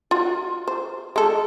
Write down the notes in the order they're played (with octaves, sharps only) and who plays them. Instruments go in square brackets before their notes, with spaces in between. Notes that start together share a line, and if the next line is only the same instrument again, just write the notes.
[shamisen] F4 F#4
C5
G#3 A4